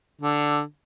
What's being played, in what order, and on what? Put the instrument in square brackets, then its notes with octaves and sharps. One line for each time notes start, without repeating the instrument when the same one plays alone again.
[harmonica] D3